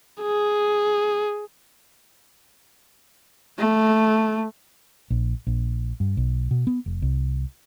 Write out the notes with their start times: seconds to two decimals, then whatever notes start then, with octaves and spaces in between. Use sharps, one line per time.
0.22 G#4
3.58 A3
5.10 A#1
5.47 A#1
6.00 G2
6.17 B1
6.51 B2
6.67 B3
6.86 F1
7.02 C2